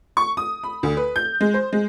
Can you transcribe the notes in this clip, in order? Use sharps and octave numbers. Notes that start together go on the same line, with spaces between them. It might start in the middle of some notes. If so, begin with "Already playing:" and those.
C#6
D#6
B5
D2
B4
G6
G#3
C5
G#3